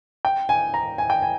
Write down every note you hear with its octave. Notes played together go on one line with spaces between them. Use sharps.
G5
G#5
A#5
G#5
G5
G#5